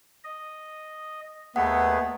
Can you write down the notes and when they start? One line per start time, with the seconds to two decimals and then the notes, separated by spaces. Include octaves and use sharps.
0.24 D#5
1.56 D#2 A3 B3 G#4 F#5